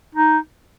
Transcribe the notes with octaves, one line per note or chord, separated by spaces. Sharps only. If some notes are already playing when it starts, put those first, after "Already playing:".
D#4